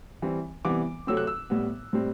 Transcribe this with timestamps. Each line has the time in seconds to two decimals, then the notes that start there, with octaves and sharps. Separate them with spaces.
0.22 E3 G3 C4
0.65 C3 E3 G3 B3 D6
1.07 C3 F#3 A3 C4 E6
1.17 F#6
1.27 E6
1.50 A2 G3 B3
1.93 A2 G3 C4